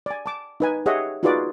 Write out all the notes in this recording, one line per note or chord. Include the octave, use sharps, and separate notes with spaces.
D5 G#5
A5 D6
D#4 B4 G#5
G4 G#4 C#5 D#5 E5 F#5
D#4 F4 F#4 G#4 B4 D5